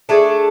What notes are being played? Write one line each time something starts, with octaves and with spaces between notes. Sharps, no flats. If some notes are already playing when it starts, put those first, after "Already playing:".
A3 D4 G#4